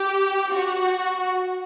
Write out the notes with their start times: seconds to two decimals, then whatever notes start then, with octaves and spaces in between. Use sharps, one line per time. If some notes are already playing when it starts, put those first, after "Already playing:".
Already playing: G4
0.53 F#4